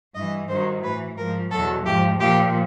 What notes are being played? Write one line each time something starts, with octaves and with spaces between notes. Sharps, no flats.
G2 E3 D#5
G2 D#3 F#3 C5
A2 E3 B4
G#2 F3 A#4
E2 B2 F#3 A4
G#2 F3 G4
A#2 F3 G4